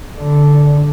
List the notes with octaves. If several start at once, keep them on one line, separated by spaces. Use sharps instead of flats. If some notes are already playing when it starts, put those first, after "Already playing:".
D3